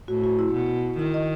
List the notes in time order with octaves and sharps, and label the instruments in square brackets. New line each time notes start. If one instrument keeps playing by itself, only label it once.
[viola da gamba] A2 [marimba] F#4
[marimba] F#4
E4
[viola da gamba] B2
[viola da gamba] D#3 [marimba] E4
[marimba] D#5